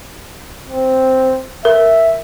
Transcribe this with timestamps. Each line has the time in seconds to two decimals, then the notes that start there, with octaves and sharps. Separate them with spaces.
0.69 C4
1.65 A#4 E5